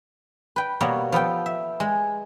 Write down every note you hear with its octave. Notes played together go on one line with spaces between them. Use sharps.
B4 G5
B2 G3 A#3 F#4 C#5
F3 B3 A4 G5
E5
G#3